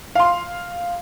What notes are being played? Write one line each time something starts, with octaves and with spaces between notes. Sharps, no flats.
F5 C6